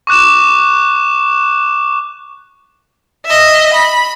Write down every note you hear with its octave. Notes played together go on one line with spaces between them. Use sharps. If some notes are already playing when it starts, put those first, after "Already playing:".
C#6 D6 F#6 E7
D#5 E5
B5